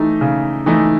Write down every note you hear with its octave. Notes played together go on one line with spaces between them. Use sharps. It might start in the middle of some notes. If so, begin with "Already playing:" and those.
Already playing: E3 A3 D#4
C#3
E3 A3 D#4